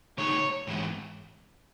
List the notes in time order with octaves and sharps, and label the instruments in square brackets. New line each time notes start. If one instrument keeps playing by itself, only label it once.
[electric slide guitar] C#3 F#3 A3 D#4 G#4 [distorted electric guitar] C#5
[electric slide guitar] G#2 E3 G#3